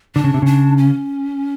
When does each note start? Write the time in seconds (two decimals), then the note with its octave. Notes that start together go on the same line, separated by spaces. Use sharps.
0.15 D3 D4
0.24 C#3
0.34 C3
0.42 C#3 D4
0.78 C#4